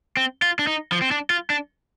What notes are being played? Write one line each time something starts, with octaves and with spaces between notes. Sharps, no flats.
C4
F4
D4
D#4
F3
C4
D4
F4
D4